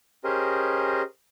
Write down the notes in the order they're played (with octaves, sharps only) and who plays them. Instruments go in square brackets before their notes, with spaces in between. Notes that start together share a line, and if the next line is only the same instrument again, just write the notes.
[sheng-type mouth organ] C#4 G4 G#4 A#4 C5 D#5